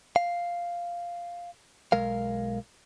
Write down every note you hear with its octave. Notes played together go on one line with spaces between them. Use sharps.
F5
B1 G#3 A#4 F5